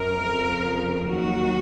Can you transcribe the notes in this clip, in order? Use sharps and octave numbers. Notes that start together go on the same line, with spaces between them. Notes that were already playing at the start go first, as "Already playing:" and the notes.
Already playing: F#2 A#4
F2 C#3 F3
D#2 D#3 F#3 F#4